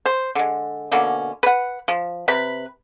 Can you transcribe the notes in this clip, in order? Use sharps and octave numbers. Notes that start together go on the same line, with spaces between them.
C5
D3 G#3
B2 D3 A#3 C#4
B4 F#5
F3
C3 B4 B5